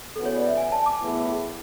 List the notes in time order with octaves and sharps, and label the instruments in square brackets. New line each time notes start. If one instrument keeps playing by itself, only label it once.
[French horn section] C#3 E3 B3 F#4 [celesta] A4
[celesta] C#5
D5
E5
G#5
A5
D6
[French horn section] A2 E3 B3 E4 G#4